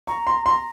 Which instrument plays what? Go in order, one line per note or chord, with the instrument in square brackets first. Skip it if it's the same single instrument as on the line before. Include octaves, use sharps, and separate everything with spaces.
[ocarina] A#5 [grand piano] C#6
[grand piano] C6
[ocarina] A#5 [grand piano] C6